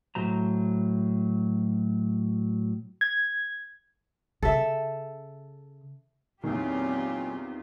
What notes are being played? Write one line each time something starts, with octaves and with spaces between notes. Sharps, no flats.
A2 F#3 C5 A#5
G#6
C#3 A4 E5
E2 A#2 D#3 F#3 C4 C#4 F4 G4